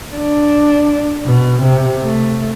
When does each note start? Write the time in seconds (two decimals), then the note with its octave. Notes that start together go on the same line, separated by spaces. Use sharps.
0.16 D4
1.25 B2
1.62 C3
2.03 A3